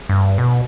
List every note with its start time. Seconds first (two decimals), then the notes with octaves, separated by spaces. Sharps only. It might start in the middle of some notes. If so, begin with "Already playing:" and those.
0.09 G2
0.38 B2